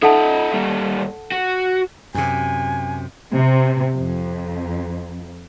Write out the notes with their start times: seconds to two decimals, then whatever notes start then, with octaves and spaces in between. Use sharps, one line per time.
0.02 D#4 A4 E5 F#5 A5
0.53 A#2 G3
1.32 F#4
2.14 F#2 C3 G#5
3.33 C3
3.94 F2